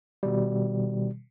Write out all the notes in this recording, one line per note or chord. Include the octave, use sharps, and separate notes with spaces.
B2 D#3 G3